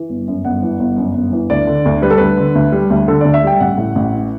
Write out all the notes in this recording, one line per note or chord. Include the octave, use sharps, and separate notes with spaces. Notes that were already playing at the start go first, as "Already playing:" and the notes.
Already playing: E3
G1
F#2
G1 F#5
E3
G1
F#2
G1
E3
D2 D5
D3
D2
G3 B4
A4
D2 B4
D3
D2
G3
D2
D3 A4
D2 D5
E5
G3 G5
A1 F#5
A2
A1
E3